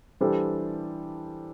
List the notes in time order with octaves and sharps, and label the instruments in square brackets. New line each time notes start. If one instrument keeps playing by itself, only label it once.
[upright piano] E3 G3 D4 A4 C5